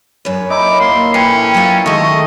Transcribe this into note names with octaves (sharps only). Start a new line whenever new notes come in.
F#2 B4 C#5
D#4 E4 D6
A#3 C6
A2 E3 C#4 G5
F#3 F4
D#3 G#3 A3 D#5 C#6